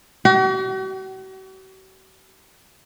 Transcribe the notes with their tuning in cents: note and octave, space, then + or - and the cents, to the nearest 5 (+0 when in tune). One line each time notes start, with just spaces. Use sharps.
F#4 +45